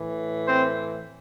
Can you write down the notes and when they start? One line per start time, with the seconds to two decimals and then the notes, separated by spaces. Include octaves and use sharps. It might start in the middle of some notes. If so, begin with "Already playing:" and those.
Already playing: A2 E3
0.47 C4 C5